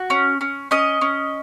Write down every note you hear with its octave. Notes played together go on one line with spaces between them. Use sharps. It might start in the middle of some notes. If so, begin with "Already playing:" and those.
Already playing: F#4
C#4
C#4
C#4 D#5
C#4